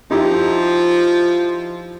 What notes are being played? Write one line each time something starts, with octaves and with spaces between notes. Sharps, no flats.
F3 D#4 E4 G4